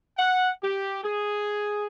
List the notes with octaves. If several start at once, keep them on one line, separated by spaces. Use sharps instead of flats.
F#5
G4
G#4